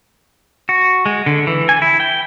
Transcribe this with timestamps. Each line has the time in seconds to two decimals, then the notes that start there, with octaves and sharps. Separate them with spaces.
0.69 F#4
1.06 G#3
1.26 D3
1.47 E3
1.69 G#5
1.82 E4
2.00 G5